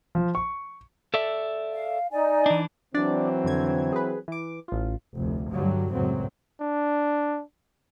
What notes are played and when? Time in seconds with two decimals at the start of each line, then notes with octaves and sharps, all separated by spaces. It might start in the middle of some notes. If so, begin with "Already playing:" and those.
0.15 F3
0.35 C#6
1.14 A4 D5 E5
1.73 F5
2.11 D#4 D5 G#5
2.46 E3 D4
2.94 E3 F#3 C4 D4 D5
3.44 F2 D3 G#6
3.92 G#4 B4
4.28 E3 D6
4.68 A1 F4
5.17 F1 D2
5.50 G2 D3 F#3 G3
5.92 C#2 F#2 A2 F#3 C4
6.61 D4